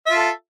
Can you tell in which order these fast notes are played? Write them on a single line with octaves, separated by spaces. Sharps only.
E5 F4 A4